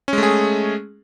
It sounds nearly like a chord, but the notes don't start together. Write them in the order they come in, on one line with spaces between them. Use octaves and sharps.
C#4 G#3 A3 G#4